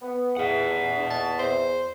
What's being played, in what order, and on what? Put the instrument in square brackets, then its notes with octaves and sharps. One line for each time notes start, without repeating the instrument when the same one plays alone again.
[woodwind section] B3
[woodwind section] E2 [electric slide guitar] D#5 F#5
[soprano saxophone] D4
A5
C5